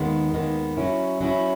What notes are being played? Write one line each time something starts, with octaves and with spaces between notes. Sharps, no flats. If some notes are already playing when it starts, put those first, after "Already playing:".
Already playing: D#2 D#3 G#3 B3
D#2 D#3 G#3 B3
F#3 C#4 E4
F#3 C#4 E4